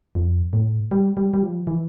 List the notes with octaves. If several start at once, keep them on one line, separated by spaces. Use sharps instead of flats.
F2
A2
G3
G3
G3
F3
E3